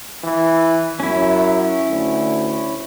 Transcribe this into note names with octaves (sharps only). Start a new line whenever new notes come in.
E3
F#2 C#4 E4
D2